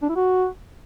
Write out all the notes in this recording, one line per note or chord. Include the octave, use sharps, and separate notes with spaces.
D4
E4
F#4